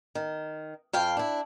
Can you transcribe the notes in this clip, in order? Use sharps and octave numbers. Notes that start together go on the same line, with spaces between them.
D#3
F2 F5 G5
D4 E4